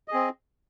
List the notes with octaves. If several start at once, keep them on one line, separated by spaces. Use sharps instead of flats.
C4 G#4 D#5